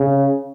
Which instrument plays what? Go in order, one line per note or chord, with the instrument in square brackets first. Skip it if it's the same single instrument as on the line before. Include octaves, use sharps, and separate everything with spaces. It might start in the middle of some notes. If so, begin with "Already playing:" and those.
Already playing: [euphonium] C#3